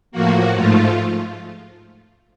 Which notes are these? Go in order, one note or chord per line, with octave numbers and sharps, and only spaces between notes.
A2 F3 A#3 F#4
G#2 F3 A3 F4